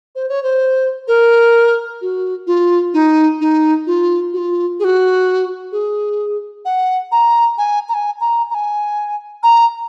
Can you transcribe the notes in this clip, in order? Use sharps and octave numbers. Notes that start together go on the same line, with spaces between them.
C5
C#5
C5
A#4
F#4
F4
D#4
D#4
F4
F#4
F4
G#4
F#4
G#4
F#5
A#5
G#5
A#5
G#5
A#5
A#5
G#5
A#5